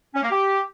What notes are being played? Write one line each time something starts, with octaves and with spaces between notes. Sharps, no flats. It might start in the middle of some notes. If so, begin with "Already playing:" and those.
C#4
A#3
G4